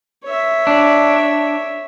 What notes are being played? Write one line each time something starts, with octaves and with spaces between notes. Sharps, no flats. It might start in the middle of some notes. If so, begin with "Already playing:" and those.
C#5 E5
D4